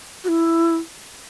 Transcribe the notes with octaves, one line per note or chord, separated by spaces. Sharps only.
F#4
E4